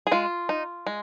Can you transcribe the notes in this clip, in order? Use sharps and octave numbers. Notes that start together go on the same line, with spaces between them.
G#4
G#3 F4
D#4
G#3